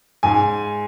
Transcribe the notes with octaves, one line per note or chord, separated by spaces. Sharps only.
G#2 G#5